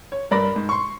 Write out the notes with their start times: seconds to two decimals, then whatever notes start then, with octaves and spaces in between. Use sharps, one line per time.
0.12 C#5
0.31 G2 A#4 D5 B5 A#6
0.56 G#2
0.69 C6 C#6